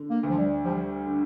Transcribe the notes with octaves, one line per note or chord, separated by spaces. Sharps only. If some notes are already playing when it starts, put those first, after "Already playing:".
Already playing: D3
A#3
D2
F3
G3
F3 G3
D3